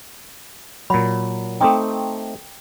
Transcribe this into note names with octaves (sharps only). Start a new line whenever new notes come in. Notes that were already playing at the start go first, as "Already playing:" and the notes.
A#2 F#3 B5
A3 C4 D#4 G5 D6 D#6